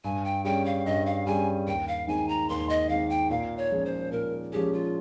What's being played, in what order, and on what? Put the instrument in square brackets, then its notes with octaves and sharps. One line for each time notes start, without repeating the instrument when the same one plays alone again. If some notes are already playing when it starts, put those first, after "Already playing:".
[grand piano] G2 [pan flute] G#5
[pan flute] G5
[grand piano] G3 C#4 G#4 [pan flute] G5
[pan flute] F5
[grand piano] G2 [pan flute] D#5
[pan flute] F5
[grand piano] G3 C#4 G#4 [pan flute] G#5
[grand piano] D#2 [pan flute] G5
[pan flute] F5
[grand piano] D#3 G#3 C4 D#4 [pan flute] G#5
[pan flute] A#5
[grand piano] D#2 [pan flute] C6
[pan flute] D#5
[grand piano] D#3 G#3 C4 D#4 [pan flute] F5
[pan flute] G5
[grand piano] A#2 [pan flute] F5
[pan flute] C#5
[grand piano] F3 G#3 C#4 G#4
[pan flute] C5
[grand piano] A#2 [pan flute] A#4
[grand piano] F3 G#3 C#4 G#4 [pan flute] G4
[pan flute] F4